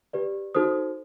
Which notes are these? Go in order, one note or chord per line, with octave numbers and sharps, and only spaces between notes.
G4 B4 D5
D#4 F#4 A4 C5 D#6